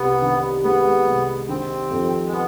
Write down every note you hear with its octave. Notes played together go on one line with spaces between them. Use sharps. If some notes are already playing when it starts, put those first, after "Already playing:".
Already playing: C2 B3
D#3
G#3 B3
C2
D#3 C4
F2
G#3
B3